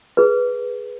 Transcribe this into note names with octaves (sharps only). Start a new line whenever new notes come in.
G#4 B4